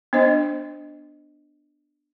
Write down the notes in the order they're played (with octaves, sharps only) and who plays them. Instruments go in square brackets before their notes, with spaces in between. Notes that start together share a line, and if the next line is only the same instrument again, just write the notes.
[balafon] B3 D4 C5 D#5